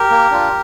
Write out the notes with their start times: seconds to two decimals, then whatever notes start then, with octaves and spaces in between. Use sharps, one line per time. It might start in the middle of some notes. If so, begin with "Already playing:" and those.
Already playing: G4 A#4
0.11 A#3
0.31 D4 F4